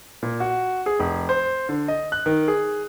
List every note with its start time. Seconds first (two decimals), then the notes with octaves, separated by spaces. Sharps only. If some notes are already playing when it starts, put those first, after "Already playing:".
0.23 A#2
0.40 F#4
0.86 G#4
0.99 F1
1.29 C5
1.69 D3
1.88 D#5
2.12 F#6
2.26 D#3
2.48 G#4